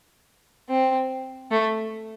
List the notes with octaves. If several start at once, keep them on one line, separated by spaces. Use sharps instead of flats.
C4
A3